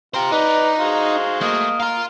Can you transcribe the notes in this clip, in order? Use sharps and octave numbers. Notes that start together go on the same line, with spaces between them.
F4 G4 C5 A#5
D#4 B4 D5
G#3 F#4 C5 F5
A3 A#3 D#5
A#4 F5 C6